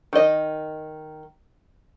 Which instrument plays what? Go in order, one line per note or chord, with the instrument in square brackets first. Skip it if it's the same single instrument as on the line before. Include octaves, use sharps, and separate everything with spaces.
[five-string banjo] D#3 D#5